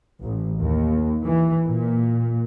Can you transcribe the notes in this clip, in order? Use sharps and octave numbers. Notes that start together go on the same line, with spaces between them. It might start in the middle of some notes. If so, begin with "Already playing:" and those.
A1
D#2
E3
A#2